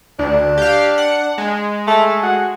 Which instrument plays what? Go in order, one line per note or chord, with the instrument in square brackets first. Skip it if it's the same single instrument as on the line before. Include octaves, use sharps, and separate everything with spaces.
[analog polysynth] D2 [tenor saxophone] D4
[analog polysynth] G4 F5
F#5
G#3
[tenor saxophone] A3
F#4